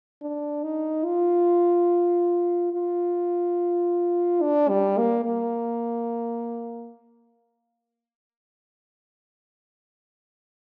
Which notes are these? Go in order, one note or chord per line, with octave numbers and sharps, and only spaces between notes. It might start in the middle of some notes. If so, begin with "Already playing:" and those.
D4
D#4
F4
F4
D4
G3
A#3
A#3